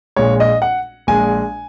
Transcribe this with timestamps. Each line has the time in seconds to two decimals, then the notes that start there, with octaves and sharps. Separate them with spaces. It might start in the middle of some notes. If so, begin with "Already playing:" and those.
0.17 A#1 A#2 G#3 C#5
0.40 D#5
0.62 F#5
1.07 A#1 A#2 G#3 G#5